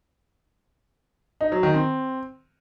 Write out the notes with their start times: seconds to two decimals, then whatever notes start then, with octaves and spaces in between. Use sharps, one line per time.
1.41 D#4
1.52 F#3
1.63 D#3
1.74 C4